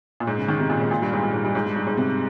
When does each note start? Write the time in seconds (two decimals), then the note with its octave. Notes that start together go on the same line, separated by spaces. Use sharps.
0.20 A#2
0.27 G#2
0.38 C#3
0.49 D#3
0.60 C3
0.70 A#2
0.81 G#2
0.91 A#2
1.02 G2
1.13 G#2
1.23 A#2
1.33 G#2
1.44 G2
1.55 G#2
1.66 G2
1.76 G2
1.87 G#2
1.97 C3